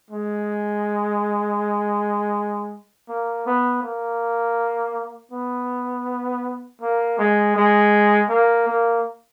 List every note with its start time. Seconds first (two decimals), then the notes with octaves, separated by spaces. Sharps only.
0.10 G#3
3.09 A#3
3.46 B3
3.83 A#3
5.32 B3
6.82 A#3
7.19 G#3
7.56 G#3
8.29 A#3
8.68 A#3